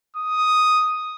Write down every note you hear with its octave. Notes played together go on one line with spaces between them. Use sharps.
D#6